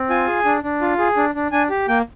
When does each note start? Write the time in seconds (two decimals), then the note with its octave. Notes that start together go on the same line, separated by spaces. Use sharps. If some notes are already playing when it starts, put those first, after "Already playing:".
Already playing: C4
0.10 F4 G#5
0.27 G#4
0.45 D4
0.64 D4
0.81 F4
0.99 G#4
1.17 D4
1.35 D4
1.52 D4 G#5
1.70 G4
1.88 A#3 G5